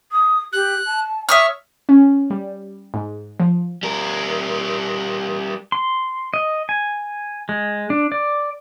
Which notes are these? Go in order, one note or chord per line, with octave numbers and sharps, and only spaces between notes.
D#6
G4 F#6
A5
C#5 E5 C#6 D#6 F6
C#4
G3
G#2
F3
G3 A#4
C6
D#5
G#5
G#3
D4
D5